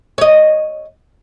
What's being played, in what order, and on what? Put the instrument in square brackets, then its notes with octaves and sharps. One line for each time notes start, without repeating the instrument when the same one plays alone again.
[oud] C#5 D#5